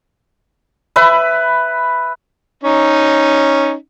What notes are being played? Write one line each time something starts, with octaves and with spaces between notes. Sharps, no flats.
B4 E5 B5
C#4 D#4